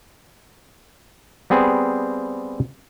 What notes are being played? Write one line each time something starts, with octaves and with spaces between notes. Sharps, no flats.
G3 B3 C4 G#4